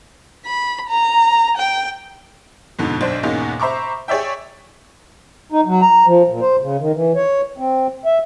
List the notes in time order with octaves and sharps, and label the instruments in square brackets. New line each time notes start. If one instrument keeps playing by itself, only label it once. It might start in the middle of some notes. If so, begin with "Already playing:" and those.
[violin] B5
A#5
G5
[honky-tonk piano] F2 G#2 B2 D3
B1 D4 C5
E2 G#2 B2 G#3 A#3 C#4
C5 E5 A#5 B5 C#6 D6
G#4 C#5 D5 E5 G5
[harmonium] D#4
F#3
A#5
F3
A#2
C5
C#3
D#3
E3
C#5
C4
E5